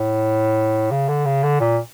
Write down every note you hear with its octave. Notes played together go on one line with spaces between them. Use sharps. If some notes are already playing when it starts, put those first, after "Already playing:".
Already playing: A2
C#3
D3
C#3
D3
A#2